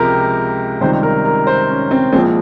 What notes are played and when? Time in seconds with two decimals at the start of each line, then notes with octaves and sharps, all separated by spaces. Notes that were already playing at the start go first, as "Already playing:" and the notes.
Already playing: C#2 C3 F3 G#3 G4 A#4
0.81 C#2 C3 D#3 G3 C5
1.03 A#4
1.25 A#4
1.47 C5
1.69 C#4
1.91 C4
2.13 C2 A#2 F3 G#3 C4